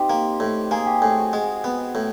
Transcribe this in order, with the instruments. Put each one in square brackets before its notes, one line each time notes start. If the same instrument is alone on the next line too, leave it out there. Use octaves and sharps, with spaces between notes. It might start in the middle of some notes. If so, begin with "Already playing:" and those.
Already playing: [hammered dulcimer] C4 D#4 F4 G4
[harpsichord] A#3
A2
[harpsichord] A#3 [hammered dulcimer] G#4
[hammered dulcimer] G4
[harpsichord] A2 [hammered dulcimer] G#4
[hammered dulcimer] F#4
[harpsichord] G#3
B3
A2